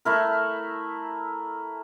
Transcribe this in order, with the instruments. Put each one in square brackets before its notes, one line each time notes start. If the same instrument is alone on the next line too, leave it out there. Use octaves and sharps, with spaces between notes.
[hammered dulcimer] A3 E4 A#4